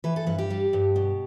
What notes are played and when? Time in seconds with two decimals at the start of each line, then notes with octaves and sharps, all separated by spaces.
0.04 E3 B4
0.16 A4
0.27 G2 B4
0.38 G4
0.50 G3
0.73 G2
0.96 B2